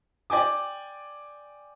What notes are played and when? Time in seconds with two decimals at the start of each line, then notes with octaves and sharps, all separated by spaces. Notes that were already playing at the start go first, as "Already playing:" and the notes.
0.30 D5 G5 G#5 D6